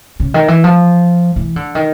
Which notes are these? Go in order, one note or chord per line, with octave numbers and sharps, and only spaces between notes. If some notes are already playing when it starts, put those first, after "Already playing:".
C#3
D#3
E3
F3
E3
D3
D#3